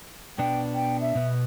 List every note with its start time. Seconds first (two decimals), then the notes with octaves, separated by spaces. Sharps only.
0.38 B2 B3 D4 G5
0.74 G5
1.01 E5
1.15 B2 B3